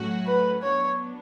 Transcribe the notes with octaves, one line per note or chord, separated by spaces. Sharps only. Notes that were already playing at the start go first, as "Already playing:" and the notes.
Already playing: A2 F#3 A3 C#4 F#4
B4
F#3 B3 D4 C#5